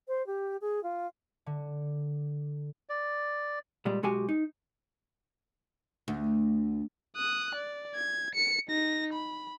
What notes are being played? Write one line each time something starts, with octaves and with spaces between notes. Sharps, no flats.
C5
G4
G#4
F4
D3
D5
A#2 G3 G#3
B1 G#3 F#4 G4 G#5
D#4
D2
D#6 F#6
D5
G#6
C#7
D#4 A#6
B5